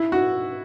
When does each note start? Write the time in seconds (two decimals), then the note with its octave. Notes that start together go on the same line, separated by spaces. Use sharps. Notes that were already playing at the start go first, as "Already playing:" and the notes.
Already playing: E4
0.12 F#4